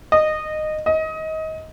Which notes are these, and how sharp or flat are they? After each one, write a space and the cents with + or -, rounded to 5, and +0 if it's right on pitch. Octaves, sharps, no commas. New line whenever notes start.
D#5 -15
D#5 +25